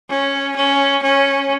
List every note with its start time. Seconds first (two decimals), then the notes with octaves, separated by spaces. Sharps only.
0.10 C#4
0.56 C#4
1.03 C#4